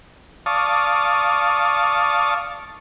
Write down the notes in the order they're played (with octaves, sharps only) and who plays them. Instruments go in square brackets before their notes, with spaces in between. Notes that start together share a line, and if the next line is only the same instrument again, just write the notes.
[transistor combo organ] D5 F5 A5 C#6 D#6